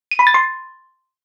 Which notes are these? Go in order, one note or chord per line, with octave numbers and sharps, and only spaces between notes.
D#7
B5
A6
C6